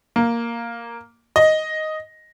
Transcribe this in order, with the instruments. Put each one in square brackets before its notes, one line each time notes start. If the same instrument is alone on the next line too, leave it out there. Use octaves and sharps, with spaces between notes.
[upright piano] A#3
D#5